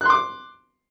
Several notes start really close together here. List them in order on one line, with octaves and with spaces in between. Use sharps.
F#6 C6 D6